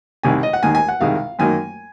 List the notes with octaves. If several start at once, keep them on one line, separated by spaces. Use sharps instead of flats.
C2 C3 D#3 G#5
D#5
F#5
D#2 D#3 A#3 G#5
G#5
F#5
C2 C3 D#3 G#3 F5
F#2 D#3 F#3 A#3 G#5